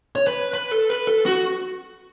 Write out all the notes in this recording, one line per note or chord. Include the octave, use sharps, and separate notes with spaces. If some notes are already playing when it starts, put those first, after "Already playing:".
C#5
B4
B4
A4
B4
A4
F#4